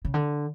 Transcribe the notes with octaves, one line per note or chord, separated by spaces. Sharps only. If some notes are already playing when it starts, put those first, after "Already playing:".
C#3
D3